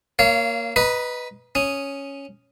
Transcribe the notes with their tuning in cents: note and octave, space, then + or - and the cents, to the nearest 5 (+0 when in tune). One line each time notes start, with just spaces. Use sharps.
A#3 +0 C#5 +20 F5 -25
B4 +0 D#5 +0 A#5 +40
C#4 +0 D#6 +0